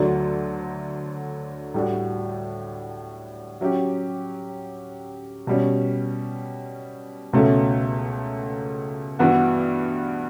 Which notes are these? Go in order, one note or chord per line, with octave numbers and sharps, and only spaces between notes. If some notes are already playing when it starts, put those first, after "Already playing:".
Already playing: D2 D3 F#3 A3 D4
A2 G3 D4 F#4
F#3 C#4 G4
B2 G3 C#4
C#2 B2 A3 C#4
G2 E3 B3 F#4